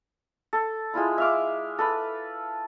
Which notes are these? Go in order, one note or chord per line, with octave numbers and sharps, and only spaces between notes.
A4
G#3 E4 F4 B5
E5 F5 D6
A4 B4 B5